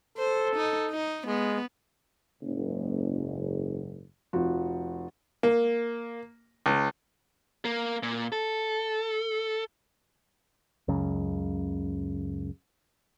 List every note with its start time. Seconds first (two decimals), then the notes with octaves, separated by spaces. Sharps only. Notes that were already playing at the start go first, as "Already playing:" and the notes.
0.18 A4 C5
0.56 D#4
0.90 D#4
1.27 G#3 B3
2.41 F#1 G#2
4.33 F1 F3 F#4
5.43 A#3
6.66 C#2
7.65 A#3
8.03 A#2
8.32 A4
10.88 C#2 F#2 C#3